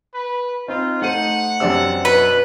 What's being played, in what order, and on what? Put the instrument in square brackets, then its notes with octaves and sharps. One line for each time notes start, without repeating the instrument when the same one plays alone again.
[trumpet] B4
[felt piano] C4 [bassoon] D#4 [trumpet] F4
[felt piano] A3 C5 D#7 [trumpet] F#5
[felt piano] F#2 D4 E6 [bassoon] C3
[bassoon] B2 [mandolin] B4